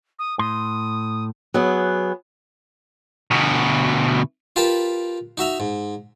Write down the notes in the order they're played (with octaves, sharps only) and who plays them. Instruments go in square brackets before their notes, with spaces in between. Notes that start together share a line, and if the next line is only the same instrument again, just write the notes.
[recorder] D#6
[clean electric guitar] A2 C6 [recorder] D#6
[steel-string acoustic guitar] F#3 B3 G#4
[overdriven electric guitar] D2 B2
[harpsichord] F4 G4 A#4 B4 A5 B5
D#4 F#4 E5 A#5
G#2